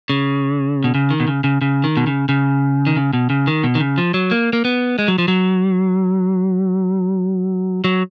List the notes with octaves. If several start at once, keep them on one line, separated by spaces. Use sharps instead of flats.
C#3
B2
C#3
D#3
B2
C#3
C#3
C#3
D#3
B2
C#3
C#3
D#3
C#3
B2
C#3
D#3
B2
D#3
C#3
F3
F#3
A#3
A#3
B3
G#3
F#3
F3
F#3
F#3